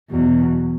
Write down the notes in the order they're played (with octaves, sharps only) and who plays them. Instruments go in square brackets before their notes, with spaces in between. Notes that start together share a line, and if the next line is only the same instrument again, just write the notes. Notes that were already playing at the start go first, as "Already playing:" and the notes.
[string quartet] E2 B2 F#3